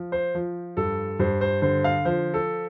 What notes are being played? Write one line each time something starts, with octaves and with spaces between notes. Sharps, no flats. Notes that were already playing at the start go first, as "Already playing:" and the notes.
Already playing: F3
C5
F3
G2 A4
G2 C5
C5
D3 C5
F5
F3 C5
A4